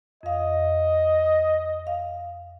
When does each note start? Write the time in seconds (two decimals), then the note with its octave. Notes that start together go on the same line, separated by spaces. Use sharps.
0.23 F2 D#5 F5
1.87 F5